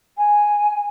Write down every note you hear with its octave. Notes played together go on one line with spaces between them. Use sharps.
G#5